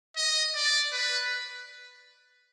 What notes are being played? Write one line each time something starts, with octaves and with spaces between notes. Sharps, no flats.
D#5
D5
B4